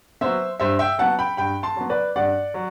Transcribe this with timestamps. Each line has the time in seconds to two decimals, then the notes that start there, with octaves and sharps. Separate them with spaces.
0.21 F#3 B3 C5 E5
0.60 G2 C5 E5
0.79 E5 G5
0.98 F#3 B3 F#5 A5
1.19 G5 B5
1.37 G2 G5 B5
1.63 A5 C6
1.76 F#3 B3
1.90 B4 D5
2.16 G2 D5 F#5
2.54 F#3